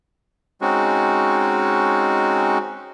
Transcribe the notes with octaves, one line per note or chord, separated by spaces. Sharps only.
G#3 C4 C#4 D#4 F#4